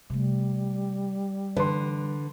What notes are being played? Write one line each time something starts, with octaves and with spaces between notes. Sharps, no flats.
C3 G3 A3
D3 E3 B4 C6